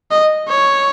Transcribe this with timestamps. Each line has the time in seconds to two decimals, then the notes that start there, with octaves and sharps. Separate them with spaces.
0.11 D#5
0.48 C#5